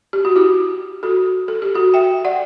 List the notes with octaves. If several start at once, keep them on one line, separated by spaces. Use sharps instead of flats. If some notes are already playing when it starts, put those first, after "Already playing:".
G4
F#4
E4 G4
F#4 A4
A4
G4
F#4 A4
E5 G5
D5 F#5